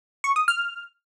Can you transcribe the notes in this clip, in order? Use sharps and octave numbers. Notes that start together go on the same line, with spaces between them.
C#6
D#6
F6